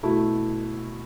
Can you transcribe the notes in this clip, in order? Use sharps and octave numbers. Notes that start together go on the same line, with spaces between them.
B2 A3 E4